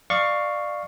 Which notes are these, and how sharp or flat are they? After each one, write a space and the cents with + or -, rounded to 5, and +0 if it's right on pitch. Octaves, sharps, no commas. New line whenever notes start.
D5 +25 F5 +0 C#6 +0